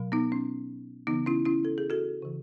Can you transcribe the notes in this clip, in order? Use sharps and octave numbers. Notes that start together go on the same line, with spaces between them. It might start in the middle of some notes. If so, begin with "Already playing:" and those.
Already playing: B2 F#3
B3 D#4
C#4
C#3 E3 B3 D#4
C#4 E4
C#4 E4
A4
G#4
F#4 A4
C#3 E3